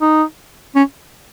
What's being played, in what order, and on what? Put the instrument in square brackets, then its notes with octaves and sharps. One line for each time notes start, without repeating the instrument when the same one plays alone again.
[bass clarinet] D#4
C#4